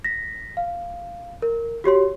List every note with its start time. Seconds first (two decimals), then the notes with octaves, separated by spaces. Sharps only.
0.05 A#6 B6
0.57 F5
1.42 A#4
1.84 F#4 G4 C#5 C6